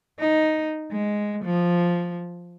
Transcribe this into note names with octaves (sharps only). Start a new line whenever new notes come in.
D#4
G#3
F3